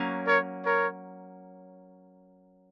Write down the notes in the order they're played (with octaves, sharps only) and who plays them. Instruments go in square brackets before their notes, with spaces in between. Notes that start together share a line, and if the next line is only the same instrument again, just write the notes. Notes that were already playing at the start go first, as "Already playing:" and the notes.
Already playing: [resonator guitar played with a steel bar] F#3 A#3 C#4
[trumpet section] A#4 C#5
A#4 C#5